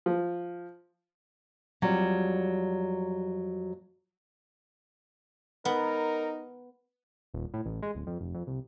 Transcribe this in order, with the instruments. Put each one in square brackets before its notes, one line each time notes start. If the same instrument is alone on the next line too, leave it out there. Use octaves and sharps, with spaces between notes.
[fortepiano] F3
[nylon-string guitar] F2 F#3 G3
[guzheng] B3 [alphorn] D#4 [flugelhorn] A#4
[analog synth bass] D#1
A2
A1
G#3
D1
F2
F1
F2
C2